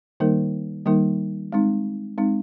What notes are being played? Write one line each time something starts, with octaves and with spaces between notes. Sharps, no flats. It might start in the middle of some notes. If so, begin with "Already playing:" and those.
D#3 G3 A#3 D#4 A#4
D#3 G3 A#3 D#4 A#4
G#3 C4 D#4
G#3 C4 D#4